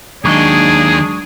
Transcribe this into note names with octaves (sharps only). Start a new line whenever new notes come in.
D#2 D#3 F#3 G#3 D4 G#4 D#5